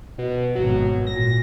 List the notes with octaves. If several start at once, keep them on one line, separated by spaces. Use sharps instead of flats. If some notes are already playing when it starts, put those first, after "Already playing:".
B2
G#1 B2 F#3
A#2 A#6